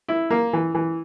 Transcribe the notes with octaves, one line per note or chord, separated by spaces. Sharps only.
E4
A#3
E3
E3